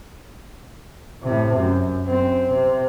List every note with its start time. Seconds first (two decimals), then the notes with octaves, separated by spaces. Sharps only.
1.23 A2 C3
1.56 F#2
2.07 F#2 C4
2.52 C3